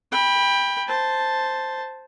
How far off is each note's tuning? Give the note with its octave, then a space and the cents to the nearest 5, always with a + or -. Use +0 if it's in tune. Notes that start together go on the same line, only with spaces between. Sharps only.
G5 +20 B5 -10
C5 +0 A5 +0